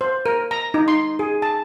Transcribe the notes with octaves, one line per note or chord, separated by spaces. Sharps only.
C5
A#4
A#5
D#4
C6
G#4
A5